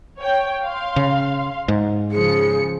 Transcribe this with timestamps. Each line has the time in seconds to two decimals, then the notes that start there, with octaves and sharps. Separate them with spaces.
0.19 C#5 G5
0.64 F5 C6
0.96 C#3
1.68 G#2
2.11 C#3 F3 G#4 C#7